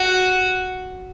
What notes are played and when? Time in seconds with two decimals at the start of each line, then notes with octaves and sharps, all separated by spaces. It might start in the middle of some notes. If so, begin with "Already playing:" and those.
Already playing: F#4